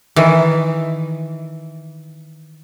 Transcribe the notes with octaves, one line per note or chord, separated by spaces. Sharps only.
D#3 E3